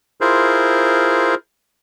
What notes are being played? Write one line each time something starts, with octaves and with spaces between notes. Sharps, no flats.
E4 F4 G#4 A#4 C5